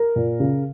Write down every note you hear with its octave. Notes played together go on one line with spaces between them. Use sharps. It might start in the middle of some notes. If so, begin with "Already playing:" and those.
Already playing: A#4
A#2
C#3